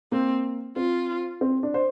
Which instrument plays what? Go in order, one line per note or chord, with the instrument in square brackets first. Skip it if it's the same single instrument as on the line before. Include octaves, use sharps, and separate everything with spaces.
[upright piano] A#3 [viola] C4
[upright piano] C4 [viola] F4
[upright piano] C4
D4
C5